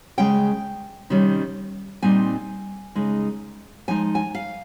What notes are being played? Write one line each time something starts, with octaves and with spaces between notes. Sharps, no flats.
C#3 G#3 C#4 G5
C3 D#3 G3 C#4
A#2 G3 C4 D#4 G#5
C#3 G#3 D#4
F3 G#3 D#4 G#5
G#5
F5